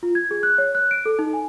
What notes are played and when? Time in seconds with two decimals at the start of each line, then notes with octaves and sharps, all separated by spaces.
0.03 F4
0.15 G#6
0.31 G#4
0.43 F#6
0.58 C#5
0.75 F#6
0.91 D7
1.06 A4
1.19 D#4
1.33 G#5